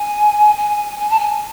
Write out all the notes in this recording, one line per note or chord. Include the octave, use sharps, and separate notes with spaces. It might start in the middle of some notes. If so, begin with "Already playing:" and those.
Already playing: G#5
G#5
G#5
A5
G#5